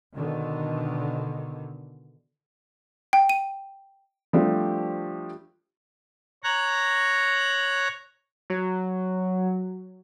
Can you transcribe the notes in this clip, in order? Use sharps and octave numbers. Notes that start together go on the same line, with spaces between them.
B2 D3 D#3
G5
D#7
F3 G3 A3 C4 D4 G4
C#5 A#5 F#6
F#3